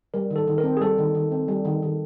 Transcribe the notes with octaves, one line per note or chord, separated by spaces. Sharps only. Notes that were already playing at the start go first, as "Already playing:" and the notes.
G3 A#4
D#3
A4
D#3
A#4
C4
G#4
G3 A4
D#3
D#3
C4
G3
D#3
D#3